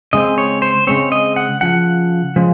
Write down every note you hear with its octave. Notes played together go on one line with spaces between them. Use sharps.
C#3 G#3 C4 D#5
C#5
C5
C#3 G#3 C4 C#5
D#5
F#5
C#3 F3 F#5
C#3 F3 G#3